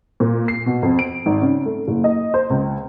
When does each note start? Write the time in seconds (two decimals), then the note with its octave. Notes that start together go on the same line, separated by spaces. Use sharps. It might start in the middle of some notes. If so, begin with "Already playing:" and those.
0.20 A#2
0.48 C7
0.66 B2
0.83 F2
0.99 D7
1.26 G#1
1.42 C#3
1.66 A3
1.88 F#1
2.04 D#5
2.34 C5
2.50 C#2